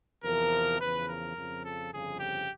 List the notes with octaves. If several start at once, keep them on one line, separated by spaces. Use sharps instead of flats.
E2 C3 F3 A#4
E2 C#3 F3 B4
A#4
F2 C#3 F3
A4
G1 F2 C#3 F3 G#4
G4